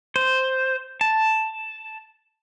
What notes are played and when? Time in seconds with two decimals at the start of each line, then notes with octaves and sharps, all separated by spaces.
0.16 C5
1.01 A5